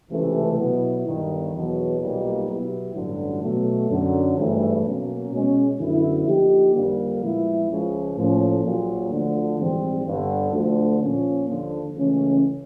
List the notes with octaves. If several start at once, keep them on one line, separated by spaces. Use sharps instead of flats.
C#2 C3 E3 A3
B2 F#3 B3 E4
G1 G2 D#3
E2 B2 F#3
B1 A#2 G3 A#3 D#4
B2 F#3 B3 E4 G4
A1 G2 D3 F#3
B2 F#3 A3
F#2 D3 F#3
G#1 G2 E3 A3
B2 F#3 A#3 C#4
B2 G#3 C#4
F#2 D3 F#3 B3 E4
D3 F3 A#3 D#4 G4
F2 D3 G3 A#3
A#2 F3 G#3 B3 E4
C#2 C#3 F3
A2 F3 A#3 C#4
A#1 A#2 F#3
D2 D3 F3
A#1 G#2 E3 G3 C4
G1 G2 D3
D2 D3 F3
A#2 F3 A#3 C#4
D#2 D3 F3
C#2 C#3 E3 A3 C#4